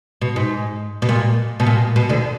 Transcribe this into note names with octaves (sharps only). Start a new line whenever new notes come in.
B2
G#2
B2
A#2
B2
A#2
B2
D2 D3